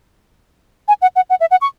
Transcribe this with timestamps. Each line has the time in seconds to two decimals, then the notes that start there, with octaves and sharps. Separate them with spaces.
0.88 G#5
1.02 F#5
1.16 F#5
1.30 F#5
1.40 E5
1.51 F#5
1.61 C#6